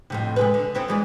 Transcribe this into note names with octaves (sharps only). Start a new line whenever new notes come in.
F2 A2 C3
C3 G#3 B4
D3
B3 C4 E4
E3 G#3 D5